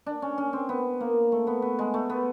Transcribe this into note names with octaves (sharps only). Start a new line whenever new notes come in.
D4
C#4
C#4
C4
B3
A#3
A3
B3
B3
G#3
A3
B3